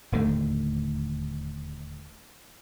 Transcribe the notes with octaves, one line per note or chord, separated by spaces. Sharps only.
D1 D#2 D3 A3